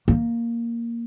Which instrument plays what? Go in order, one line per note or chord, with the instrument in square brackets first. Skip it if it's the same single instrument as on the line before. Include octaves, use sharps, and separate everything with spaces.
[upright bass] A#3